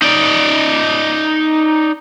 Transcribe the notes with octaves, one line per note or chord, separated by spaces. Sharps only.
D#4 D5